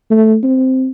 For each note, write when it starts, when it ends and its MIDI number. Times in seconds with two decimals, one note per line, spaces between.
0.10 0.37 57
0.43 0.90 60